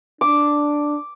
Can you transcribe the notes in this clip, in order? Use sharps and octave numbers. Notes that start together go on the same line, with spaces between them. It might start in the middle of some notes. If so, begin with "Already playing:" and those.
D4 D6